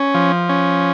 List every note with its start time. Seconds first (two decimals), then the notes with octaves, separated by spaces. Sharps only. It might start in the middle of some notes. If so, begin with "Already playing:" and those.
Already playing: C#4
0.14 F3
0.49 C#4